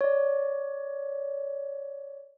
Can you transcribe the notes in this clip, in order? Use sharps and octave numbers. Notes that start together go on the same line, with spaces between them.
C#5 D5